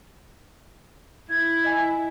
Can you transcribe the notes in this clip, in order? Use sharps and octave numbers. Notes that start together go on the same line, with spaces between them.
E4 G#6
D#5 G#5